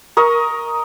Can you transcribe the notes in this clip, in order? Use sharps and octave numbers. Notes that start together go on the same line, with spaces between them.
A#4 D#5 C#6